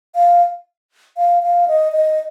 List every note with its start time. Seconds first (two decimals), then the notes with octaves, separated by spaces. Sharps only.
0.15 F5
1.17 F5
1.43 F5
1.68 D#5
1.92 D#5